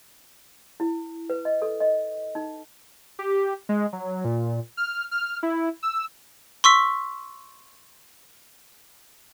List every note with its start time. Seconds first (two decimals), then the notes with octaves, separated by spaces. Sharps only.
0.80 E4
1.30 B4
1.45 D#5
1.62 A4
1.81 D#5
2.35 D#4
3.19 G4
3.69 G#3
3.93 F#3
4.25 A#2
4.77 F6
5.11 F6
5.43 E4
5.83 E6
6.64 C6 C#6 E6 B6